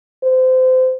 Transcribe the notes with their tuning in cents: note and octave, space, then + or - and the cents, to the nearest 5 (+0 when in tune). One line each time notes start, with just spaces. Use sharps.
C5 -25